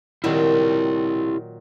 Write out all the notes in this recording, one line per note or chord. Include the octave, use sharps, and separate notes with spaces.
A#2 D#3 F#3 E4 G4